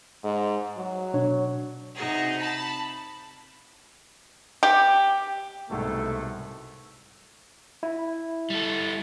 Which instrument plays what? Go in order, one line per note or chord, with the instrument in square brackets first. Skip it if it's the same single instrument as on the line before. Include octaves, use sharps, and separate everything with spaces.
[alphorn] G#2
F#3
[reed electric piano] B2 D4 C#5
[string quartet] C3 D#4 F#4 G#4
A5 B5
[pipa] G4
[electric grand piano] C2 G#2 B2 [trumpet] A3
[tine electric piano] E4
[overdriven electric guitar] G3 A4